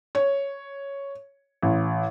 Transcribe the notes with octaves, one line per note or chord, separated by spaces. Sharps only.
C#5
A1